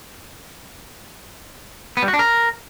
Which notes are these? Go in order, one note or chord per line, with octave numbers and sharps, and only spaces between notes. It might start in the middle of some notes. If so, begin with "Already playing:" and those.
B3
G3
F#4
D4
A#4